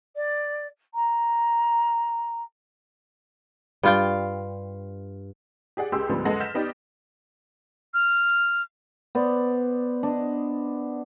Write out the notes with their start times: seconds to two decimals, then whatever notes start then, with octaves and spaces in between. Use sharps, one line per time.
0.16 D5
0.94 A#5
3.83 G2 F4 G5
5.77 G4 G#4 D5 F#5
5.92 C#2 G4 G#4 G5 C6 E6
6.09 D2 G#2 D3 F3 G3 B3
6.25 F#1 G#3 A4 B4 F#5 A#6
6.40 F6 G6 A6 B6 E7
6.55 B3 D#4 G4 D5
7.94 F6
9.15 B3 C5 D5
10.03 D4 D#5